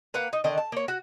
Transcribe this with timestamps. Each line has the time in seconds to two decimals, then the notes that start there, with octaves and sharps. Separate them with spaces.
0.14 A#3 B4 F5 F#5
0.33 D#4
0.44 D3 D#3 D4 D#5
0.58 A5
0.72 A#3 C#5
0.88 F#4